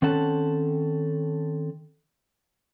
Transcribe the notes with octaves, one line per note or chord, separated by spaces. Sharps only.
D#3 C4 C#4 A4 F#5 A5